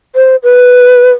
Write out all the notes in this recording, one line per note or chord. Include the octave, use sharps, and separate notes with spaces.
C5
B4